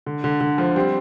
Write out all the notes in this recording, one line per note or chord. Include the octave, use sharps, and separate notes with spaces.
D3
D3
D3
F3
G3 C4